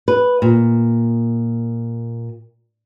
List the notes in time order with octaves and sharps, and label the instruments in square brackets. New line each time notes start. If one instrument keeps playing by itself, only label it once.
[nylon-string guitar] B4
A#2